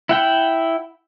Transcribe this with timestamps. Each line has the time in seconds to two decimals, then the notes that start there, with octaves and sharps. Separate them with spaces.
0.09 E4 F#5 G5